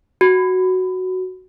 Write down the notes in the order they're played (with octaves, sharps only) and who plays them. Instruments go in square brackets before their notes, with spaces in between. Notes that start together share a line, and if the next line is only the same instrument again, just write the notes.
[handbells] F#4